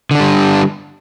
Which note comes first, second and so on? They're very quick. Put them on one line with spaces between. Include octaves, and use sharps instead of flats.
D3 D4 G3